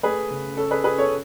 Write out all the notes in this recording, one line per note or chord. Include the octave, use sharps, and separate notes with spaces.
A3 G#4 B4
C#3
C#4 A4
G#4 B4
C#4 G#4 B4
A4 C#5